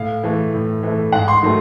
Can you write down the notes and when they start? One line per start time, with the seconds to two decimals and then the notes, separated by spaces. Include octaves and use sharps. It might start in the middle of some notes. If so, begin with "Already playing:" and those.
Already playing: A2 F5
0.24 E3 A3
0.54 A2
0.83 E3 A3
1.12 G#2 F#5
1.28 C6
1.43 D#3 F#3 A3